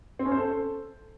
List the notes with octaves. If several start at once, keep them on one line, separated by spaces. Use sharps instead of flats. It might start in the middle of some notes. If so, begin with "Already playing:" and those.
C4
C#4
C5
A4